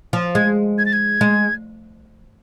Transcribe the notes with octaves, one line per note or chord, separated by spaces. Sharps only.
F3
G#3 G#6
G#6
A6
G#6
G#3